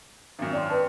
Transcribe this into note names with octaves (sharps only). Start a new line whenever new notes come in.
G#1 F#2
D5 G5 C6
B4 A5